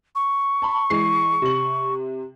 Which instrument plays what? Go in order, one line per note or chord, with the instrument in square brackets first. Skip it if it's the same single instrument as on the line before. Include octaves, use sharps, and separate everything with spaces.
[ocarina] C#6
[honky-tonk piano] A5 B5
E3 G#3 C7
C3 F#7